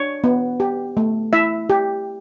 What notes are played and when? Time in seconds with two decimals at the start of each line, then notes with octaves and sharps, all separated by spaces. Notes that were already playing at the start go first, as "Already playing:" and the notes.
Already playing: D4 C#5
0.24 B3
0.60 G4
0.97 A3
1.33 E4 E5
1.70 G4